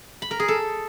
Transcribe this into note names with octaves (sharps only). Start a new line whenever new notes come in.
B5
A#4
G#4
A4